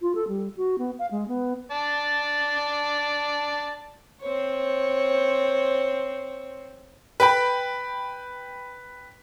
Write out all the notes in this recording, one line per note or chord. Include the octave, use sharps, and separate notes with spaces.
F4
A4
G3
F#4
B3
F5
G#3
B3
D5 A5
C4 C5 C#5
B4 G5 B5